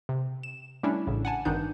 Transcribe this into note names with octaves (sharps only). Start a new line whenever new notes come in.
C3
E7
G3 A3 C#4 D4 E4
A1 A2 C#3
F#5 G#5 A5
G#1 G2 D#3 D4 D#4 G6